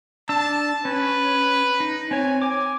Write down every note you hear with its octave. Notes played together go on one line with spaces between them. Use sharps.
D4 A5 E6
C#4 B4
D#4
C4 C#5 G#5
G#5 D6